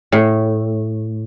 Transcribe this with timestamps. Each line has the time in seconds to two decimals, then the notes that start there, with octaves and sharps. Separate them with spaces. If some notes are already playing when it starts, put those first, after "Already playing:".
0.12 A2